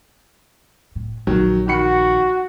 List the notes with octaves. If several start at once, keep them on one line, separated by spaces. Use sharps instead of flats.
A2
A#1 D#3 F#3
D#3 F#4 B5 C#7